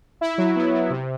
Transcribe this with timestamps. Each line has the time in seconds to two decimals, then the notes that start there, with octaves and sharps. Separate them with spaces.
0.21 E4
0.38 F#3
0.56 B3
0.73 F#3
0.90 C3